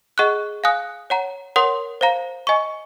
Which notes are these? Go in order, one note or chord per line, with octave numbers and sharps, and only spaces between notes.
G#4 D#5 F#5 C#6 F#6
F5 G#5 D#6 F#6
C#5 F#5 A#5
A#4 C#5 F#5 C6 D#6
C5 F5 A#5
D#5 G#5 C#6